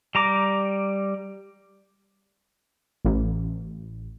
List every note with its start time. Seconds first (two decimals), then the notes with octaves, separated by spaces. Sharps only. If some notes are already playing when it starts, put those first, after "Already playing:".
0.15 G3 A#5 D6
3.04 A1